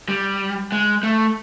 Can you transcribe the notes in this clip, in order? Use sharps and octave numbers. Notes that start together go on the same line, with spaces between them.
G3
G#3
A3